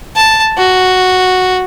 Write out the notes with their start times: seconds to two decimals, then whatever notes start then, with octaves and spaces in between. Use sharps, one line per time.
0.16 A5
0.57 F#4